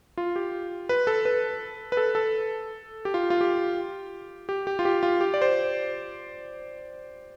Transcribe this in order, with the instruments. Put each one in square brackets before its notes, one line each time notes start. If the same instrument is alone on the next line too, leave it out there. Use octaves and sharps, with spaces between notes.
[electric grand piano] F4
G4
B4
A4
B4
B4
A4
A4
G4
F4
F4
G4
G4
G4
F4
G4
F4
G4
D5
C5